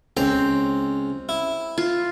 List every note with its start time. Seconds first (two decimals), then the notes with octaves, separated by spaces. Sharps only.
0.17 C#2 C4 A#5
1.29 E4
1.78 F4